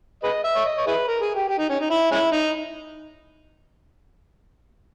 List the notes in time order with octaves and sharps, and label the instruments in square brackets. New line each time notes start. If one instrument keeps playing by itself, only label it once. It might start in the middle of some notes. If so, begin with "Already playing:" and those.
[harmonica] G#4 B4 D#5
E5
C#5
D#5
C#5
E4 G#4 B4
A#4
G#4
G4
G4
D#4
C#4
D#4
E4
G#3 C#4 E4
D#4